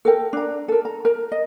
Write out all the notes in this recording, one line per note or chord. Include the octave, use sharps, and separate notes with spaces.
A4 A#4 G5
D4 A#5
A4 A#4
A#5
A#4 A#5
D#5